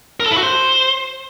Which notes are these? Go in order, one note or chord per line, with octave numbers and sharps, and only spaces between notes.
A#4
A4
E4
F#4
C5